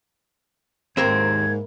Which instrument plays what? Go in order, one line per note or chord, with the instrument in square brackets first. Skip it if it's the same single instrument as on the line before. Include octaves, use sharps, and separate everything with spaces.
[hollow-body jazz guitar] D#2 C4 A#4 [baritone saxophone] G#2 [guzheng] A#3 E4 [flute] G#6